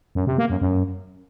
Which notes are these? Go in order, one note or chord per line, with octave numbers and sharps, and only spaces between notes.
F#2
C3
A#3
F#2
F#2